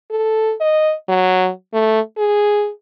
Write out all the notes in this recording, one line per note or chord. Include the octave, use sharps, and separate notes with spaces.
A4
D#5
F#3
A3
G#4